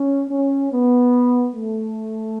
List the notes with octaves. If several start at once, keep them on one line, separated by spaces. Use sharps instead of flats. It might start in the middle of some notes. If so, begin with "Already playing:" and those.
Already playing: C#4
C#4
B3
A3